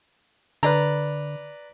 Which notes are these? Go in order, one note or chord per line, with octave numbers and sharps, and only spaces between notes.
D3 B4 D5 A#5